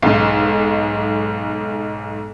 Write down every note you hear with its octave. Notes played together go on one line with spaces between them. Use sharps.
B1 G#2